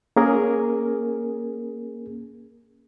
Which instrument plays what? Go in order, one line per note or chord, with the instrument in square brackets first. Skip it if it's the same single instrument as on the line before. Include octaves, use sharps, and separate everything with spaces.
[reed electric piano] A#3 C#4 G#4 A#4